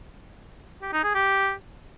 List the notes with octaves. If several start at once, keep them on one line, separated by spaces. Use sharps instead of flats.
G4
D#4
G#4
G4